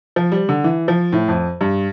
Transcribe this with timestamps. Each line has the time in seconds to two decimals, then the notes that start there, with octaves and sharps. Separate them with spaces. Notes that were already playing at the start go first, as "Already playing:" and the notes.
0.16 F3
0.32 G3
0.49 D3
0.64 E3
0.88 F3
1.13 A2
1.28 F2
1.61 G2